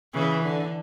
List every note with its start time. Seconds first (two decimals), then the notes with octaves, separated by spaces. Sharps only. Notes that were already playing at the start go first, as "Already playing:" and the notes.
0.13 C#3 E3
0.43 D3